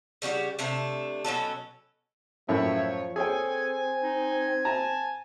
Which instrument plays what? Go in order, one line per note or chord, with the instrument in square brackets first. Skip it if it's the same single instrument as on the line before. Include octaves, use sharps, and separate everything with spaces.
[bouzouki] C#3 G3 F#4 G4
C3 A3 D4
B2 F#3 C#4 A4
[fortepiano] F#2 A2 E4 [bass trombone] F3 [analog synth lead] C#5 [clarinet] E5
[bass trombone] C4 [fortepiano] G#4 C#5 G5 [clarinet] A4 [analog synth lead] G#5
[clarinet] D#4
[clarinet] A5 [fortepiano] A#5